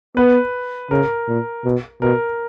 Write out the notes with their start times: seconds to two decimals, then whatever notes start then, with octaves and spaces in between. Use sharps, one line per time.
0.17 B3 B4
0.91 C#3 A#4
1.28 A#2
1.65 B2
2.02 B2 A#4